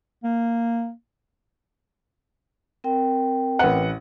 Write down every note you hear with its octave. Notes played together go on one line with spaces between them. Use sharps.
A#3
C4 A#4 G5
A1 B4 F#5